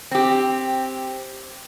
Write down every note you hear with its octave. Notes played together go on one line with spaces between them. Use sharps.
C4 G4